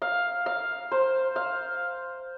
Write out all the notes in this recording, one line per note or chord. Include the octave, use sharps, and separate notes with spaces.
F5
F5
C5
F5